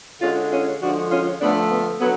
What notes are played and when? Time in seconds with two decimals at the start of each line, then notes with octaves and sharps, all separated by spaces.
0.21 D3 G#3 C#4 F4
0.51 C#4 F4
0.81 D3 F3 G#3 D4 F#4
1.10 C#4 F4
1.40 D3 F3 A3 B3 D4
1.70 B3
1.99 D3 F#3 B3